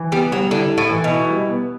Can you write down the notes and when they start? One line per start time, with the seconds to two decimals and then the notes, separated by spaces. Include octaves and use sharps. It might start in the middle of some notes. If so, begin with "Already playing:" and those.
Already playing: E3
0.12 G3 B3
0.32 F#3 G3
0.51 D3 E4
0.71 E4
0.78 A2
0.91 E3
1.04 B2
1.11 E4
1.30 G3
1.49 B3